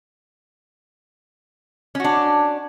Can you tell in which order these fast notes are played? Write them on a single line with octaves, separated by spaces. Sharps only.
C#4 F#4 D4